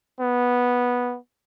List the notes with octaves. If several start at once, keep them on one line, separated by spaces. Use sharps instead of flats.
B3